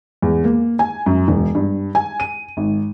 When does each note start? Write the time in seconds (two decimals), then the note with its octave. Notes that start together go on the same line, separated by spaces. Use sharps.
0.22 E2
0.44 A#3
0.79 G#5
1.06 F#2
1.28 E1
1.55 G2
1.95 G#5
2.20 D#7
2.57 G#1